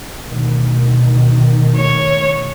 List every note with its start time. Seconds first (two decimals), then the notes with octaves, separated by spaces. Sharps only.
0.22 D2 B2 D#3
1.76 C#5